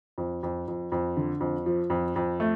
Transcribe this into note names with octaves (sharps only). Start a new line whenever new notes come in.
F2
F2
F2
F2
D3
F2
F3
F2
F2
A3